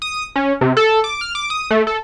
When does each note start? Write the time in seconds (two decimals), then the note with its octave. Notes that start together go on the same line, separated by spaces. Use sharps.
0.02 D#6
0.36 C#4
0.61 C3
0.77 A4
1.04 D6
1.21 F6
1.35 D6
1.50 D#6
1.71 A3
1.87 A4